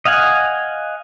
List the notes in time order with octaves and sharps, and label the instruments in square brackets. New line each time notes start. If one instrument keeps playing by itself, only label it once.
[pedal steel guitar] D#5 F5 F#5 G#5